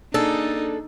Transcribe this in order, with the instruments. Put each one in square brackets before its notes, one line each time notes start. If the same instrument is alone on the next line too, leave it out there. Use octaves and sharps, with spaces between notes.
[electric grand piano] A#3 D4 G#4 [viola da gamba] D#4 [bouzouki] A4